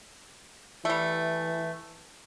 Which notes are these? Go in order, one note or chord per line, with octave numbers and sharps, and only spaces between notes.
E3 G3 A3